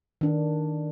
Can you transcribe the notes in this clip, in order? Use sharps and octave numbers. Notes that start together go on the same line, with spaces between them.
D#3 D4